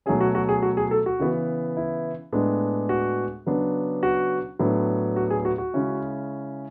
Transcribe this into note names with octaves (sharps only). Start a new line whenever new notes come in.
B2 F#3 A3 C#4 G#4
F#4
F#4
G#4
F#4
G#4
A4
F#4
C#3 E3 B3
E4
A2 G#3 B3 D4
F#4
C#3 F#3 B3 D4
F#4
A2 F#3 B3 D4
F#4
G#4
F#4
F#4
C#3 G#3 C#4 E4